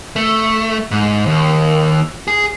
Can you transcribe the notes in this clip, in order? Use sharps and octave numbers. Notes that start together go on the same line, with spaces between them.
A3
G#2
D#2
G#4